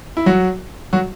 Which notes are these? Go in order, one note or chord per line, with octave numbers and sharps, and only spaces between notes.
E4
F#3 F#4
F#3 F#4